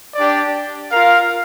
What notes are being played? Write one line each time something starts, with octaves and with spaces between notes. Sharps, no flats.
D4 G4 D5
F4 A#4 F5